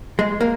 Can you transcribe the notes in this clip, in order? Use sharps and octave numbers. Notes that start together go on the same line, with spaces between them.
G#3
A#3